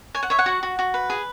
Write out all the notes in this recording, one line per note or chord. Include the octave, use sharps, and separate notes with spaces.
C#5 G#5
F#5
C#5 E5
F#5
F#4
F#4
F#4
B4
G#4